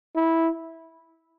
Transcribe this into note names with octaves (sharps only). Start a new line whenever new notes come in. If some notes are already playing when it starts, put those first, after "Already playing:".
E4